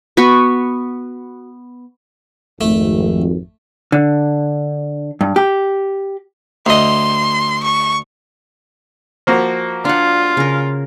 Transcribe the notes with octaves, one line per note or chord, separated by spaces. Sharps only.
B3 F#4 B5 C#6
G#1 F2 A3
D3
G2
G4
D2 D#5 C6
C#6
F3 A#3 F#4
D4 F4 F#5
C#3 A#4